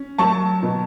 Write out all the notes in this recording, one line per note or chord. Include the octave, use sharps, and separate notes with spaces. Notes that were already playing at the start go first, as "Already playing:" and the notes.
Already playing: C#4
F#3 A5 C#6
B2